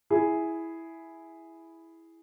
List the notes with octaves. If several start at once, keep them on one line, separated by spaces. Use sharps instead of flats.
E4 G#4